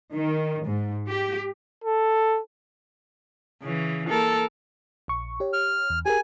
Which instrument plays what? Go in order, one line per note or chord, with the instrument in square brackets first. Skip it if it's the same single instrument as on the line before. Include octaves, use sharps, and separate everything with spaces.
[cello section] D#3
G#2
G4
[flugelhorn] A4
[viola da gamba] C#3 E3
A#3 A4 A#4
[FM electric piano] A#1 C#6
G4 C#5
[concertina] F6
[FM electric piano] E2
[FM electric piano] G4 G#4 A#4 [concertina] G#5